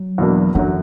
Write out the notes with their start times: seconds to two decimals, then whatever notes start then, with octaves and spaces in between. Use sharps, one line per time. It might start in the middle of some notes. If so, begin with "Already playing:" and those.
Already playing: F#3
0.18 E2 B2 A#3 D4
0.55 F#2 D3 E3 F#3